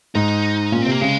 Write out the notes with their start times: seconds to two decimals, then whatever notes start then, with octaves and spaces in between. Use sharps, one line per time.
0.15 G#2 D#4
0.72 A#2 C#4
0.82 C3 C4
0.92 A#3
1.01 C#3 G#3